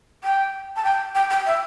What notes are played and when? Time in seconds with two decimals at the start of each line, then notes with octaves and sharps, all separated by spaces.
0.24 G5
0.76 A5
0.84 G5
1.15 G5
1.30 G5
1.46 E5